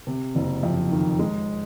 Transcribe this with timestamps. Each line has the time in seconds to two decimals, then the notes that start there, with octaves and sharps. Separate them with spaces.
0.07 C3
0.35 F#1
0.63 F2
0.91 D#3
1.19 G#3